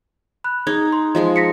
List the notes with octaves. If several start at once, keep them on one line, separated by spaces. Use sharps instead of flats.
B5 F#6
D#4 G#4 G#6
C6
F3 G#3 D#5 C6
A#6 B6 C#7